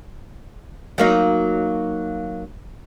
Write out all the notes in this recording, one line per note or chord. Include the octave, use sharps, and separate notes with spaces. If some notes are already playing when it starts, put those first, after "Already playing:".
F#3 A#3 D#4